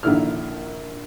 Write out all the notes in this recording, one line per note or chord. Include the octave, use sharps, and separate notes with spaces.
A#1 D3 D#3 A#3 E4 F6